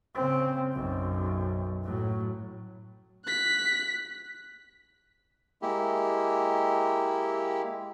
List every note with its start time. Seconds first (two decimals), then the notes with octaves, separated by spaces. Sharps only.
0.15 C#3 C4
0.72 B1 F#2
1.83 A2 F#3
3.26 F#6 B6
5.62 G#3 A#3 E4 G4